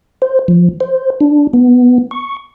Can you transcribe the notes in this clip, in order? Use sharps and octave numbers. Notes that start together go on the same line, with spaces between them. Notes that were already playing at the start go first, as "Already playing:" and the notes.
C5
F3
C5
D4
B3
C#6